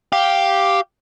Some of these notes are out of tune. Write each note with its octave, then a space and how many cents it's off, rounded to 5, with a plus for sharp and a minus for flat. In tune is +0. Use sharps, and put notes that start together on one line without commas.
G4 +0 F5 +0